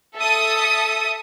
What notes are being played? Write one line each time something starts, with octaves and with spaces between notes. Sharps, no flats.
A4 E5 D#6